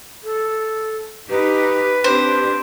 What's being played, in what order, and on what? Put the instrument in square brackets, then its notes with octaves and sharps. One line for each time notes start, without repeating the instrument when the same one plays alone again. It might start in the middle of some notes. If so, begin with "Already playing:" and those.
[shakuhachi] A4
[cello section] D#4 G4 [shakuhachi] B4
[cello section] C4 D4 G4 [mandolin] C5